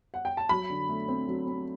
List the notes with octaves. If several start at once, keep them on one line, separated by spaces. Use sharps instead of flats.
F#5
G5
A5
F#3 B5
D3
A3
C4
F#3
C4